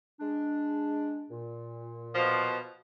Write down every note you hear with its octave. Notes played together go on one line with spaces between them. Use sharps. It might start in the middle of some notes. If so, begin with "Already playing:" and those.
G#3 D4
A#2
B2 F3